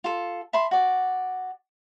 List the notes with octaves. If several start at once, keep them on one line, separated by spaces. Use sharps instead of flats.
F4 A4
E5 A5 B5 C6
F#4 D5